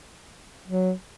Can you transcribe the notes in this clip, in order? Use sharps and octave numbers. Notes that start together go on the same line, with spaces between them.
F#3